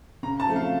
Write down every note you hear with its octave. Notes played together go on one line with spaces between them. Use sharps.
C#3 A#5
A5
F3 A3 C4
F5